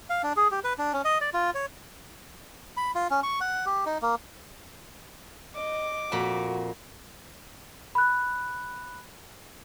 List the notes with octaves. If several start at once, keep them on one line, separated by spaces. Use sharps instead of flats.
F5
D4
G#4
G4
B4
D4
C#4
D#5
D5
F4
C#5
B5
F4
C#4
C#6
F#5
G4
D#4
A#3
D#5 D6
F2 A#2 F#4 B5
B5 F#6